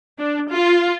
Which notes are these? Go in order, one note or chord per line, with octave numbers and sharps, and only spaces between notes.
D4
F4